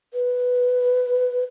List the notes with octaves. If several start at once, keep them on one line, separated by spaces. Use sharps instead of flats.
B4